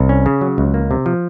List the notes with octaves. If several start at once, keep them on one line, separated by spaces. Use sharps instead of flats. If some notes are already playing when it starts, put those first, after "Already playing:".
Already playing: C2
C#4
C#3
F#3
C#2
A#3
C3
F3